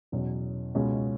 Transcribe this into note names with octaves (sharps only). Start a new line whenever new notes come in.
E2 B2 F#3 C#4
C#2 B2 G#3 C#4